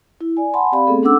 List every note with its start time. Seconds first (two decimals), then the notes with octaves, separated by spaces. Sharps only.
0.21 E4
0.37 D5 G#5
0.54 F#5 G#5 A5 B5 C6
0.72 C4 G4 D5 F5 B5
0.87 A3 B3 C4 G#4 A4
1.03 C#4 D4 A4 F#5 D6 E6